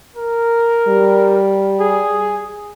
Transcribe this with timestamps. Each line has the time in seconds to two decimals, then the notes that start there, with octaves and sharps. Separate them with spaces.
0.16 A#4
0.88 G3
1.80 G#4